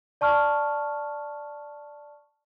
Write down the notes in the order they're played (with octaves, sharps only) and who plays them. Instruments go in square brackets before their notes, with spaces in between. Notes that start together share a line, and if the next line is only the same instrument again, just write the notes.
[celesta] D5 A5 C#6 F6